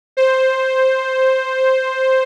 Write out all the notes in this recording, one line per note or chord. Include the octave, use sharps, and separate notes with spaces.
C5